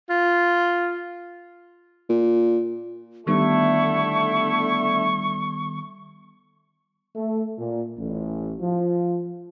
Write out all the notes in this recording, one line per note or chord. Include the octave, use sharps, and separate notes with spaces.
F4
A#2
D3 D#3 G3 A3 B3 E4 C#6
A3
A#2
A1
F3